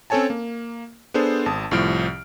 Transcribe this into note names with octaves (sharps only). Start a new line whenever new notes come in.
C4 C#4 A4 C#5 G#5 A5
A#3
B3 D4 G#4 A4 C5
G#1 A5 D#6
C2 A2 F3 F6 D7